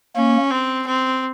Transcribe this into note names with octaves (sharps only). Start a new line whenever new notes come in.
A#3 C#4
C4
C4